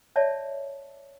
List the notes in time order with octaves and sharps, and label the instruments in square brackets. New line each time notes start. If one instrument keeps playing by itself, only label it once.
[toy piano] C#5 D5 E5 A5